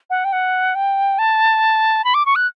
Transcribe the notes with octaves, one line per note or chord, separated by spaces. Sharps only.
F#5
G5
F#5
G5
A5
B5
D6
C#6
F#6